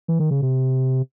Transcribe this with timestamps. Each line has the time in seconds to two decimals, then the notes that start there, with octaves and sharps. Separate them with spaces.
0.08 E3
0.20 D#3
0.31 C#3
0.42 C3